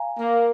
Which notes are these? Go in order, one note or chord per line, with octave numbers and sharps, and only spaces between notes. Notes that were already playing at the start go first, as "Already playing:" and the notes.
Already playing: F5 G#5 A#5
A#3